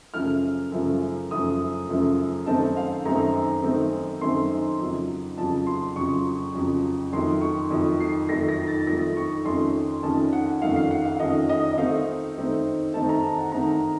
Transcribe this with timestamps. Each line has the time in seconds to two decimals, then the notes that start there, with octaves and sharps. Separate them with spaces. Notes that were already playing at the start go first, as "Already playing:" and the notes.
0.14 F#2 C#3 F3 A3 F6
0.72 F#2 C#3 F3 A3
1.31 F#2 C#3 F3 A3 D#6
1.89 F#2 C#3 F3 A3
2.46 F#2 D#3 A3 C4 D#4 A5
2.77 F5
3.05 F#2 D#3 A3 C4 D#4 A#5
3.63 F#2 D#3 A3 C4 D#4
4.21 F#2 D#3 A3 C4 D#4 C6
4.80 F2 C#3 F#3
5.37 F2 C#3 F#3 A5
5.67 C6
5.96 F2 C#3 F#3 C#6
6.55 F2 C#3 F#3
7.13 F2 D#3 F#3 A3 C6
7.41 C#6
7.71 F2 D#3 F#3 A3
8.00 C7
8.29 F2 D#3 F#3 A3 A#6
8.48 A#6
8.68 A6
8.87 F2 D#3 F#3 A3 A#6
9.17 C#6
9.45 F2 D#3 A3 C#4 C6
10.03 F2 D#3 A3 C#4 A5
10.33 F#5
10.62 F2 D#3 A3 C#4 F5
10.76 F5
10.91 F#5
11.05 F5
11.19 F2 D#3 A3 C#4 D#5
11.49 D#5
11.73 D#5
11.77 D#3 A3 C4 D#4 F5
12.36 D#3 A3 C4 D#4
12.94 D#3 A3 C4 D#4 A5
13.09 A#5
13.23 A5
13.39 F#5
13.52 D#3 A3 C4 D#4 A#5